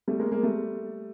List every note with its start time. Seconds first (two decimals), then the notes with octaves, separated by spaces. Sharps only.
0.08 G3 A3
0.20 G#3 A#3
0.32 G#3 A#3
0.43 G3 A3